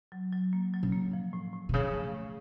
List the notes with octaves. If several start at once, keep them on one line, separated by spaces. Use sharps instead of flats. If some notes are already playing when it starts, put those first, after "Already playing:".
F#3
F#3
A#3
F#3
C#3
A#3
F3
A2
A2
C3
C#3 F3
A3
A2